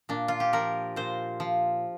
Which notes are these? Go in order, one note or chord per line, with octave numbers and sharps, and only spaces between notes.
A#2 D4
F4
G4
F3 A#4
A#2 C5
F3